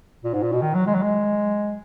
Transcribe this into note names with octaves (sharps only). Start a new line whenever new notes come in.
A#2
G#2
A#2
B2
D#3
F#3
G#3
F#3
G#3